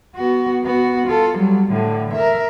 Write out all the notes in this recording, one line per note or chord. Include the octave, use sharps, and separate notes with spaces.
B3 F#4
B3 F#4
F4 A4
F#3 G3
A2 D3
A#4 E5